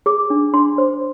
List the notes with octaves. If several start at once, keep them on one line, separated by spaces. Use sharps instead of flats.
G#4 D6
D4
D4 C6
C5